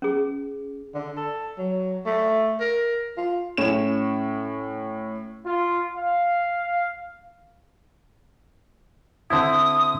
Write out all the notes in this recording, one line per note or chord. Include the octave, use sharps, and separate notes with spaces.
C#4 G#4
D3
A4
F#3
A3
A#4
F4
A2 C#4 E7
F4
F5
D3 C4 E4 D#6